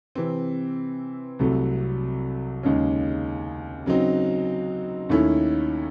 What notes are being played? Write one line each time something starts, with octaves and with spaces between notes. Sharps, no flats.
C3 E3 C4
C2 C3 F#3 A3
D#2 C#3 G#3 C#4
C#3 F#3 C4 D#4
D#2 D#3 A3 C#4 E4